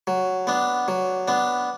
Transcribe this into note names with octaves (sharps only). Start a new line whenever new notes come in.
F#3
B3 D4
F#3
B3 D4